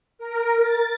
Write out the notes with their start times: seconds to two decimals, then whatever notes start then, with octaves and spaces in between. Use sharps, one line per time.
0.18 A#4
0.62 A6